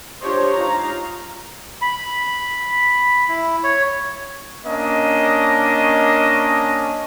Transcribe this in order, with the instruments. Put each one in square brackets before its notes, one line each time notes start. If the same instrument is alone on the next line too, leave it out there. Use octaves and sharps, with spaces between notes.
[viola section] D4 F4 G4 C5 C#5 D#5
D#4 F4 F5 A#5
[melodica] B5
E4
C#5
[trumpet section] A#3 C#4 D4 D#5